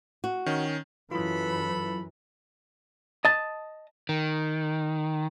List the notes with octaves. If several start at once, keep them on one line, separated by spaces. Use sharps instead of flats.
F#4
D#3 C#4
F#2 E3 F#3 E4 F4 A4 B4 B5
D#5 A5
D#3